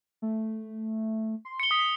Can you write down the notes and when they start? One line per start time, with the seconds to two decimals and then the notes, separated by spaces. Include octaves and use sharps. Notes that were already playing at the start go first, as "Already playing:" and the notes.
0.22 A3
1.45 C6
1.60 C#7 G7
1.71 D#6 B6